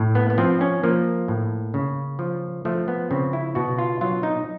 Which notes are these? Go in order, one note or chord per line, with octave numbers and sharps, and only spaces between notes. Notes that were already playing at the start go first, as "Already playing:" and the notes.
Already playing: A2
B3
B3
F3 C4
C#4
F3 A#3
A2
C#3
F3
F3 A3
B3
C#3 C4
E4
B2 F#4
F4
F#3 F4
D#4